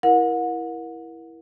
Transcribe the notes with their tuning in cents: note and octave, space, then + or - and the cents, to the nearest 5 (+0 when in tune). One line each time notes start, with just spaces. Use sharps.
E4 +0 A#4 +20 F#5 -35